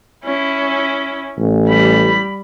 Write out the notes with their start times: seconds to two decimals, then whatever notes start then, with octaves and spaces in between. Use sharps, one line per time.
0.24 C#4 E4
1.38 A1
1.67 G3 B5